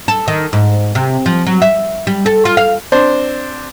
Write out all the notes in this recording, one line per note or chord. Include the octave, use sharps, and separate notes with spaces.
A4
D#3
G#2
C3
F3
F#3
E5
G3
A4
F4
F5
C4 D4 C5